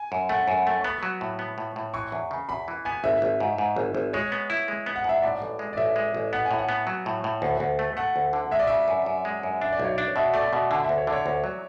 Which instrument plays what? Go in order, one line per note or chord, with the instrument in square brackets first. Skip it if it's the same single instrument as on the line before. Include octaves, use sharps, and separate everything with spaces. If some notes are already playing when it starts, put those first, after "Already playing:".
Already playing: [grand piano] G#5
[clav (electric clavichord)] F#2
[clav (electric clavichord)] A3 [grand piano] F#5
[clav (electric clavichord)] F#2
A3
[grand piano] C#6
[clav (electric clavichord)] B3 [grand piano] B5
[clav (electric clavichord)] F#3
A2
B3
A2
A2
[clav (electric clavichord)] E3 [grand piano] C#6
[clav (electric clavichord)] E2
C#3
[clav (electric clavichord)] E2 [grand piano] B5
[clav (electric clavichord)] E3
[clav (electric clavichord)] B3 [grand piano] G#5
[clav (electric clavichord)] G#1 [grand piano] E5
[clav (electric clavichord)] G#1
G#2
G#2
G#1
G#1
[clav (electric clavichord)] G#3 [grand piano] C#5
[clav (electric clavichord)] B3
E4
G#3
B3
[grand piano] F#5
[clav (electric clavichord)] G#2 [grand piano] E5
[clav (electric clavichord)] A2 [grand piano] D5
[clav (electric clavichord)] A1
G#3
[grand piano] D5
[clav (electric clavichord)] A1 [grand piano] E5
[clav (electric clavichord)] G#3
A1
[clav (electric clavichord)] B3 [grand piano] F#5
[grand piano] G#5
[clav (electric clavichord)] A2
[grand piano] F#5
[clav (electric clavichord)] B3
F#3
A2
A2
D2
D2
A3
[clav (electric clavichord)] A3 [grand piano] F#5
[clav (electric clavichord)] D2
D3
[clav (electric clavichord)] G#3 [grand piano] E5
[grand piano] D5
[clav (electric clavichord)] C#3 [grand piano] E5
[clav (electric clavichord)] F#2
F#2
G#3
F#2
[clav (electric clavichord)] D4 [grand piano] E5
[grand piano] D5
[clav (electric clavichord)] B1 [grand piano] C#5
[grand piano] D5
[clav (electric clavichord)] D4
[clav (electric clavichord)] B2 [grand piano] E5
[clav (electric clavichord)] A3 [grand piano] D5
[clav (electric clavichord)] B2 [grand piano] E5
[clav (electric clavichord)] D3 [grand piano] G#5
[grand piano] E5
[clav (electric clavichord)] D2
[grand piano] C#5
[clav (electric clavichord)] D3 [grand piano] D5
[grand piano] C#5
[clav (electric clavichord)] D2
F#3